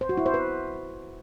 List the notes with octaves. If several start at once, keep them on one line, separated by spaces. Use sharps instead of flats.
C5
F#4
E4
C5
B4